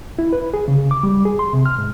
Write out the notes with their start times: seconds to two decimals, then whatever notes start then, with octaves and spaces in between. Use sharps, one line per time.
0.19 E4
0.33 B4
0.54 G#4
0.68 C#3
0.91 D6
1.03 G3
1.25 G#4
1.39 C6
1.53 C3
1.66 F6
1.78 G#2